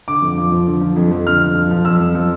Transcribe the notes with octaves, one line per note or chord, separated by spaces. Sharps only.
D3 D6
F2
F3
F3
D3
F3
F2
F2
D3 F6
F2
F3
F3
F2 E6
F2
F3